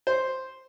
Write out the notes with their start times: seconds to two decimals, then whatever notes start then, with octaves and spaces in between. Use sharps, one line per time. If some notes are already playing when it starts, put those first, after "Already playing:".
0.07 C5